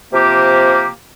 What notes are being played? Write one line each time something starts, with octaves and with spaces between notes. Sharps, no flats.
C3 F3 A#3 G4